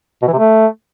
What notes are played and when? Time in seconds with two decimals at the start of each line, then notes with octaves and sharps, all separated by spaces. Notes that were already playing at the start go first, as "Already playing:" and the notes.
0.22 B2
0.27 E3
0.33 C3
0.38 A3